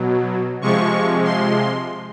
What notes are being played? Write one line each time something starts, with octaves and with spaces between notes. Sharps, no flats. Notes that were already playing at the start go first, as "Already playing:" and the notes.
Already playing: B2 F#3
C3 F3 G#3 C#6
C6